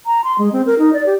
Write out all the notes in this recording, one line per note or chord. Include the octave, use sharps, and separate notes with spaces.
A#5
C6
G#3
C4
A#4
D#4
D5
G4